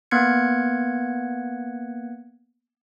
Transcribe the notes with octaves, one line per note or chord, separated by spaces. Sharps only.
A#3 B3 F#6 G#6 C#7